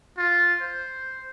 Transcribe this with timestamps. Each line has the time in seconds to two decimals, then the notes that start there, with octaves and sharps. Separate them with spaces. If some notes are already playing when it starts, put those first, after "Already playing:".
0.18 F4
0.61 C5